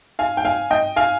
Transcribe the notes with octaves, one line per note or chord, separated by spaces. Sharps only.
F5 G#5
G5
F5 G#5
D#5 G5
F5 G#5